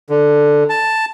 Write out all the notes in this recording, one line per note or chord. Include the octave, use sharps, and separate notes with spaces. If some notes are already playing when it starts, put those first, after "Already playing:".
D3
A5